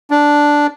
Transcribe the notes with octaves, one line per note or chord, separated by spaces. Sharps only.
D4